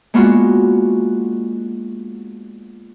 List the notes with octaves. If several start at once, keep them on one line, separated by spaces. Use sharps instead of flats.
G#3 A#3 B3 D4 F4 F#4